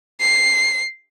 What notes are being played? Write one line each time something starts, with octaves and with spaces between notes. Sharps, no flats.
C7